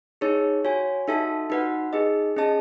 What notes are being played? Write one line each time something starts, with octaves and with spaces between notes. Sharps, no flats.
D#4 G#4 C#5
F#4 C#5 G#5
D#4 F#4 A4 E5 A5
D#4 F#4 B4 F#5
D#4 G#4 D#5
C#4 G#4 D#5 A5